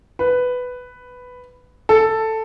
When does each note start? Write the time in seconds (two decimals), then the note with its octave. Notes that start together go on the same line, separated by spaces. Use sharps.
0.19 B4
1.89 A4